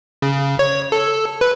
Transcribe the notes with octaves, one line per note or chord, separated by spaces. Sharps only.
C#3
C#5
A4
B4